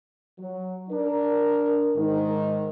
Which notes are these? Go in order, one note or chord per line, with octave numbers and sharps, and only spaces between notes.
F#3
D4 A#4
G#2 D#3